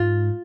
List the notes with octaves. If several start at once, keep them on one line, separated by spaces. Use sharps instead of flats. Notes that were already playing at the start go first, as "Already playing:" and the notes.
Already playing: G#2 F4